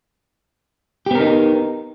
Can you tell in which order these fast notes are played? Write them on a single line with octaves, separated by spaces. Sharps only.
G4 B3 A#4 D#4